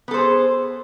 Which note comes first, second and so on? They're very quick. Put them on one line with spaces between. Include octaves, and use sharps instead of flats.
B3 A4 C5 G#4